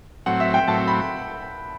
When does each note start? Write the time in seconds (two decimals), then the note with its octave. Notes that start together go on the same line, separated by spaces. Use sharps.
0.26 A2 F#3 C4 F#5
0.40 E5
0.54 G5
0.68 A2 F#3 C4 A5
0.87 B5